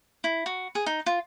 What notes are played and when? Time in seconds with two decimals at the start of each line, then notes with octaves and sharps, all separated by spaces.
0.24 E4
0.46 F#4
0.75 G#4
0.86 D#4
1.06 F4